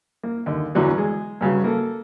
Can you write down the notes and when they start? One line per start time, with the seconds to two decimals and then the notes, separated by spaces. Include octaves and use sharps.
0.23 A#3
0.46 D#2 D3
0.75 E2 A2 D3 F#3 B3
0.98 G#3
1.41 G2 C#3 F#3
1.64 A#3 A4